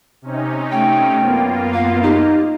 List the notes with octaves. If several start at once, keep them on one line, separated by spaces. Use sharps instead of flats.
C3 C#4 D#4
A3 G5
F#2 A#3 B3 F4
F5
D#4 G4